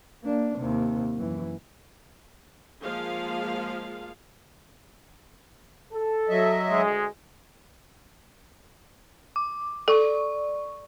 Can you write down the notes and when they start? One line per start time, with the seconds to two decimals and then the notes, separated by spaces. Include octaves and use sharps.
0.23 A#3 D4
0.57 D#2 C3
1.14 F#2 E3
2.83 F3 G#3 A#3 G#4 F5
5.92 A4
6.29 F#3 D#5 E5
6.70 D2 G#3
9.36 D6
9.88 A4 D5 C#6